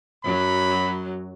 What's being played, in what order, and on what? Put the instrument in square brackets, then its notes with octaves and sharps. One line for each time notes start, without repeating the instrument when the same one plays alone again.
[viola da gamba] F#2 F#3 [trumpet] B5